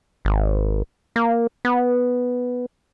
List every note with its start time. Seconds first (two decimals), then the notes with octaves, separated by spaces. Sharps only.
0.25 G#1
1.16 A#3
1.65 B3